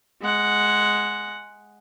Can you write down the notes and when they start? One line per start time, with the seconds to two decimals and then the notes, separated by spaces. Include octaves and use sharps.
0.21 G#3 F#5